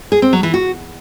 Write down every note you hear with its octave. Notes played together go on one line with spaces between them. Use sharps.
G#4
C4
F#3
E3
F#4